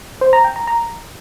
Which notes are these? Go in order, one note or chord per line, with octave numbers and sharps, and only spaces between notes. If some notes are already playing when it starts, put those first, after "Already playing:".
C5
A#5
G5
A#5
A#5